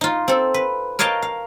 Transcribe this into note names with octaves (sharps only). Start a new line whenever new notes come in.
D#4 F4
C4 A4
B4
A#4 C#5 D#5 F5 G5 A5
F5